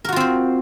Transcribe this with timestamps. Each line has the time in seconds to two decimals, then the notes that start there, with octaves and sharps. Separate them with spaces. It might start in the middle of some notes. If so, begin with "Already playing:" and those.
0.04 A#4
0.08 F#4
0.12 F4
0.16 C4
0.20 C5